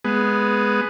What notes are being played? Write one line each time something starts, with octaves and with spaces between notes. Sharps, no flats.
G#3 B3